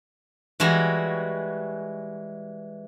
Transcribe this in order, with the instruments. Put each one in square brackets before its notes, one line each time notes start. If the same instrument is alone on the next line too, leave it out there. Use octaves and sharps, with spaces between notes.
[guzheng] E3 G3 G#3 F#4